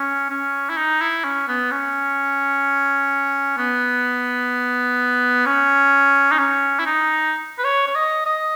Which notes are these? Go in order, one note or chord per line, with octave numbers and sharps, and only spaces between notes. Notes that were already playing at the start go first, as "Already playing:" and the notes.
Already playing: C#4
C#4
E4
D#4
E4
C#4
B3
C#4
B3
C#4
D#4
C#4
E4
D#4
B4
C#5
C#5
D#5
D#5